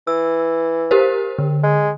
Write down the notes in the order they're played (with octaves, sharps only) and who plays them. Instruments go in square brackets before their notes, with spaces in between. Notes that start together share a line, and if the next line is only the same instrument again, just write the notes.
[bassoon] E3 [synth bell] E6
[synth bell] G4 A#4 C5
D3
[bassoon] G#3